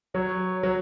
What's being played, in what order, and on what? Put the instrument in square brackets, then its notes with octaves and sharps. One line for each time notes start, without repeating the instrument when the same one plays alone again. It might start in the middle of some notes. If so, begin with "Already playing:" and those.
[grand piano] F#3 [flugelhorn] C#5
[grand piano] F#3